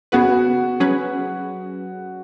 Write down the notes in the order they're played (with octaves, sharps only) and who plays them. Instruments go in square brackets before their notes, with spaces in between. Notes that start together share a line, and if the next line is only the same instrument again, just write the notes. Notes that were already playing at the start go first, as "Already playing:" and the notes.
[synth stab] C#3 B3 G#4 B4 [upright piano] F#4
[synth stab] F#3 C#4 G#4 B4